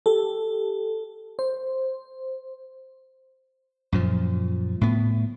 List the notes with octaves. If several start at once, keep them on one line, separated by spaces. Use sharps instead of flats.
G4 A4
C5
F#2 A#2 F3
A2 B3